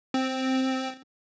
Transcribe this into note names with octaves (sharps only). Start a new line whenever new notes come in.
C4